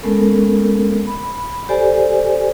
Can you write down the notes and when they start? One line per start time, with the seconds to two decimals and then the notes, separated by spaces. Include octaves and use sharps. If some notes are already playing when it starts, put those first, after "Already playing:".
0.03 G#3 A3 B3 C#4 A4 A#4
1.07 B5
1.69 G4 A4 C5 D5 G#5